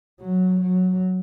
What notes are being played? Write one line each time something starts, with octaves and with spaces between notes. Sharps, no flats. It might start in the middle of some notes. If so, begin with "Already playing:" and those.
F#3
F#3